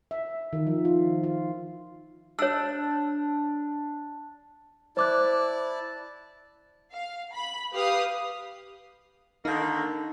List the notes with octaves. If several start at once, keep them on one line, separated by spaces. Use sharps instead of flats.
E5
D#3
F3
F4
F4
D4 C#5 E6
E4 C5 D5 A5 D6 F#6
F5
B5
G4 B4 F5 D#6
D3 D#3 A#3 D#4